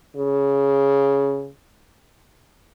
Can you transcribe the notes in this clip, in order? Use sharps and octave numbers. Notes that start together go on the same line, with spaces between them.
C#3